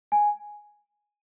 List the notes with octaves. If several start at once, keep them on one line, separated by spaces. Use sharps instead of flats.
G#5